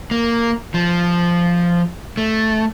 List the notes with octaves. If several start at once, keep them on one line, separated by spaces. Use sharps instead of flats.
A#3
F3
A3